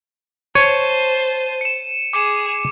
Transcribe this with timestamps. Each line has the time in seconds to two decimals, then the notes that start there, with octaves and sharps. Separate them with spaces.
0.55 C5 C#5 A5 D#7
1.61 C#7 E7
2.13 G#4 D6 C#7 E7